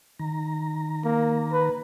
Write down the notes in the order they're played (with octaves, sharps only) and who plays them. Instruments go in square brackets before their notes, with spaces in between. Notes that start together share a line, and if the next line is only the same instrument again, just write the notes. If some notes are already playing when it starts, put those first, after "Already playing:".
[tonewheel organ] D#3 A#5
[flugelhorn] A#3
B4